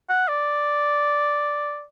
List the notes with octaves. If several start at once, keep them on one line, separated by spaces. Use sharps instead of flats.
F#5
D5